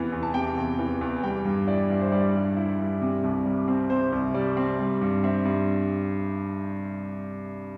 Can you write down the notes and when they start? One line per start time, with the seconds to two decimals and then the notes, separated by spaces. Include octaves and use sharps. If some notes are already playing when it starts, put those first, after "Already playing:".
Already playing: E2 C3 E3
0.12 E2
0.23 A5
0.34 C3 G5
0.57 E2
0.79 E3
1.01 E2
1.23 G3 G5
1.45 G2
1.67 E4 D5
1.90 G2
2.01 C5
2.12 G3 D5
2.35 G2
2.57 E4
2.79 G2
3.02 C3
3.24 C2
3.46 G3
3.68 C4
3.90 C3 C5
4.12 C2
4.34 G3 D5
4.57 C4
4.79 G3
5.01 G2
5.24 C4 E5
5.45 G2